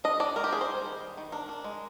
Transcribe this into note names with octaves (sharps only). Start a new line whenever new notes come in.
D4 D#5
D4 D5
G#3 A#4
G4
D4 G#4
C5
G3
D#3
G3
D#3
D4 A#4
D4
G#3